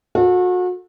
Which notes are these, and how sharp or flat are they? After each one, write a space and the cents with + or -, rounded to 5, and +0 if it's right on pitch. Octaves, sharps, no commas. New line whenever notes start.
F#4 -35 A4 +0